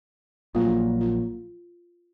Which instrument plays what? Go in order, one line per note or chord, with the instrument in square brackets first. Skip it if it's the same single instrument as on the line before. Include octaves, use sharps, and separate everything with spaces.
[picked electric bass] A#1 A#2 F#3 A#3 [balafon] F4
[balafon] F4